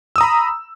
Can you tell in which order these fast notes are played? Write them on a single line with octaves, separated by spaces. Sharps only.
E6 D#6 A#5 B5